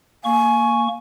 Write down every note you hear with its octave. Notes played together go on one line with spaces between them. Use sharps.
A#3 G#5 C#6